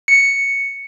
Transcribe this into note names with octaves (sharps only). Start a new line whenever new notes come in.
C#7